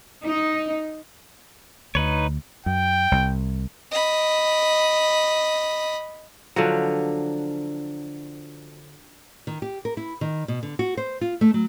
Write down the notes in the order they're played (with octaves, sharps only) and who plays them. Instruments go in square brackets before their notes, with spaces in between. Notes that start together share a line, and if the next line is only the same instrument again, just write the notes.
[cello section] D#4
[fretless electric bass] D2 [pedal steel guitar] D#4 B4 C#5
[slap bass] F#2 [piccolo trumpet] G5
[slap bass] C2
[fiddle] D#5 B5
[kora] D3 F3 F#3
[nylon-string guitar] D#3
G4
A#4
E4
D#3
B2
D3
F#4
C5
F4
A3
F#3